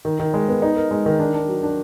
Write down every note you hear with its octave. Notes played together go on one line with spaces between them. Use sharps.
D#3
D#3
G#3
B3
D#4
A#4
G#3
D#3
D4
D4
F#3
D4